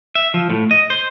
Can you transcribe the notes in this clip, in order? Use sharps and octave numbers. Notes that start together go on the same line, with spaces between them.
E5
F3
A2
D#5
C5